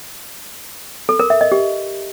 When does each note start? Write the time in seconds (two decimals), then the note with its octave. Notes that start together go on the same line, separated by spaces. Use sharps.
1.09 A4
1.20 A#4
1.30 E5
1.41 D#5
1.52 G4